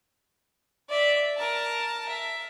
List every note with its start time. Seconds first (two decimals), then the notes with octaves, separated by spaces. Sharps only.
0.89 D5 E5
1.37 A#4 A5
2.09 E5